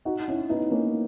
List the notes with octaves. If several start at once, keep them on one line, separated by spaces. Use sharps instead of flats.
D#4 F#4
C#4 E4
B3 D#4
A#3 C#4